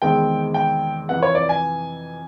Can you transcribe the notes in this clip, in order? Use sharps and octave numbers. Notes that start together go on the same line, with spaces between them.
E2 C3 D#3 G#3 C4 G5
G5
F2 C3 E3 F#5
C#5
D5
G#5